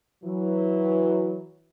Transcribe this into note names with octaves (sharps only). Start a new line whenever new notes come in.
E3 F#3